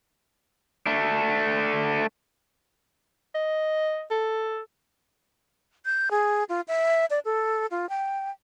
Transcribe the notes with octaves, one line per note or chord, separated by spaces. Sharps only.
A3 D4
D#5
A4
G6
G#4
F4
E5
D5
A4
F4
G5